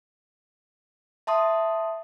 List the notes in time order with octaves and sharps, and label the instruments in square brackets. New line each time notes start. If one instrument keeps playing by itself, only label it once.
[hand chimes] E5 A5 C6 D#6